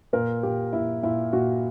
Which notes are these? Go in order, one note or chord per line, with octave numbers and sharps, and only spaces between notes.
A#2 A#4
A#2 G4
A#2 E4
A#2 E4
A#2 F#4